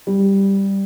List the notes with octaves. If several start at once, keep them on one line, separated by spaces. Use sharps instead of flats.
G3